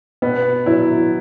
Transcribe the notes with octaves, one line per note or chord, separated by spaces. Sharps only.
B2 B3
F#3 E4